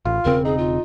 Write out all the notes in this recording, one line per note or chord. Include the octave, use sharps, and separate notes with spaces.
A1 F4
E1 C#3 C4 A#4
D#4 G#4
F4